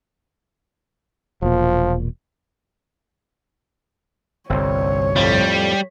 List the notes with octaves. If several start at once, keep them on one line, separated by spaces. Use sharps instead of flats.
E1 A#2 F3
G1 C2 C4 C#5
F2 A2 G3